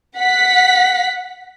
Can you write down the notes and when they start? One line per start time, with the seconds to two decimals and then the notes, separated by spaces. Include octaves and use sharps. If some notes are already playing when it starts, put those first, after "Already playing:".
0.18 F#5 B6